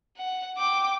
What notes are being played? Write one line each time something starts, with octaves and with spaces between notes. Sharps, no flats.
F#5
G5 D6